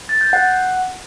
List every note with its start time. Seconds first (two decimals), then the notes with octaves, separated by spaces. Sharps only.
0.09 A6
0.21 G6
0.33 F#5